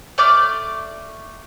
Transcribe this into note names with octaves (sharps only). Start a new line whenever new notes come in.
A3 D5 D6 F6